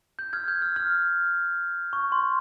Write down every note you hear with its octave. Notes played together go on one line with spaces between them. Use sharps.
G6
F6 G#6
G6
F6
F6
C#6
C6